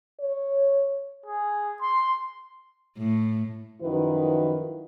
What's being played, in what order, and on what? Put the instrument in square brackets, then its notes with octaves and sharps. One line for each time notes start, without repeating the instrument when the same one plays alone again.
[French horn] C#5
[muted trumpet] G#4
C6
[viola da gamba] A2
[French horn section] F#2 D#3 F3 E4 F#4 B4